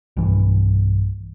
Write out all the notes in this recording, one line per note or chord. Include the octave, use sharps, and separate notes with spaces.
B1 G2 E3